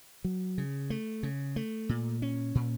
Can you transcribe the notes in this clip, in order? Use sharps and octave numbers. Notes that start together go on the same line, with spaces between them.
F#3
C#3
A3
C#3
A3
A#2
C#4
A#2